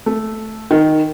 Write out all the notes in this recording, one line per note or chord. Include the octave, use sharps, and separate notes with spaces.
A3
D#3